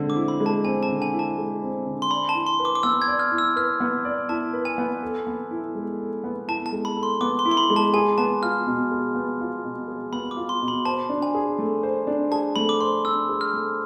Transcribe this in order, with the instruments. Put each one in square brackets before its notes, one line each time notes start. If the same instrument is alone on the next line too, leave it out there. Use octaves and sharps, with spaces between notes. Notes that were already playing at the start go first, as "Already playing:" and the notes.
Already playing: [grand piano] D3 G#3 C4
[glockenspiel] D6
[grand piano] E4
[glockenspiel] B5
[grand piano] G#3
[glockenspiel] A5
[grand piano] C4 [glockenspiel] G#5
[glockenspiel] A5
[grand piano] D3
[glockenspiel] G#5
[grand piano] E4
[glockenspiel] A5
[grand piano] G#3
C4
D3
[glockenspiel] C6
[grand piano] D5 [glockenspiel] B5
[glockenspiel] A5
[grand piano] E4
[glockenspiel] C6
[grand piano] B4
[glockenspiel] D6
D6
[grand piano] B3 [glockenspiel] E6
[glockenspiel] G#6
[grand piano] D5
[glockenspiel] F6
[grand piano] E4
[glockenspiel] E6
[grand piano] B4 [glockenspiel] F6
[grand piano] B3
D5
[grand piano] E4 [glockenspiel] A5
[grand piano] B4
[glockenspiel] G#5
[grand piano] B3
A4
B3
E4
G#3
A4
B3
[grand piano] E4 [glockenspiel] A5
[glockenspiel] A5
[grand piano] G#3
[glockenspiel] B5
[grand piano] A4
[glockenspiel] C6
[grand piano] B3 [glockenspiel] D6
[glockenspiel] C6
[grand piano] E4
[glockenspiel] C6
B5
[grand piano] G#3
[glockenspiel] A5
[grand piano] G#4 [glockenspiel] G#5
[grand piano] B3 [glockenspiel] A5
[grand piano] F4 [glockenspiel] F6
[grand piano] B2
G#4
B3
F4
B2
G#4
[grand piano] B3 [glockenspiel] B5
[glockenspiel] D6
[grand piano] F4
[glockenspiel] C6
[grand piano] B2
[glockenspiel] B5
[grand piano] C5 [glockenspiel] A5
[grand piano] D4
[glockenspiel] G#5
[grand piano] G#4
A3
C5
D4
[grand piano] G#4 [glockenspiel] A5
[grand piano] A3 [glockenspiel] B5
[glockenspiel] D6
[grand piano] C5 [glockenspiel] C6
[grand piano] D4 [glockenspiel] E6
[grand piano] G#4
[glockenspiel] F6
[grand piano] A3